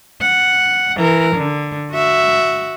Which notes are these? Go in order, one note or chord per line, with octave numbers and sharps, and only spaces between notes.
F#5
E3 A#4
D3
F#4 E5